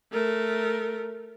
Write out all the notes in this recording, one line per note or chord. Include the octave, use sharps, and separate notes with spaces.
A3 A#4